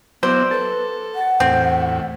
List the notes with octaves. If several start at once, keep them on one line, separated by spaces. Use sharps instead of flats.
F#3 B3 E4 C5 D5
A4 B4
F#5
E2 A2 C4